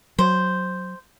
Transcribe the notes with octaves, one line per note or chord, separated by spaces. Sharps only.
F#3 C5